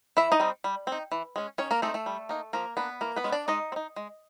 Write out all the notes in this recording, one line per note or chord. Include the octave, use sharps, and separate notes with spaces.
E3 E4 E5
D#4 D#5
G3 C4
G3
C4
D#4
E3
G#3 C#4
D#3 C#4 C#5
A#3 A#4
G#3 A3 C4 D#4 A4
A3 A4
G3
A#3 D#4
F3 A#3 A#4
A#3 B3 D4 B4
E3 A#3 A#4
B3 B4
G#3 C#4
D4 D5
G#3 D#4 D#5
C4
D#4
G#3